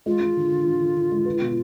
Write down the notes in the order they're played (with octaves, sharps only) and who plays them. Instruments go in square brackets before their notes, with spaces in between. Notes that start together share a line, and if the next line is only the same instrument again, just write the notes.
[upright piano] G#3 [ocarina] F4
[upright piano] G#3
D3
D3
D3
D3
D3
G#3
B4
B2